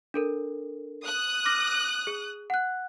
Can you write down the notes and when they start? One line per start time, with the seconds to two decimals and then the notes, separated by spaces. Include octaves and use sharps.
0.14 D4 A4 A#4
1.04 D#6 F#6
1.45 D6 F6 A#6
2.07 G#4
2.50 F#5 F#6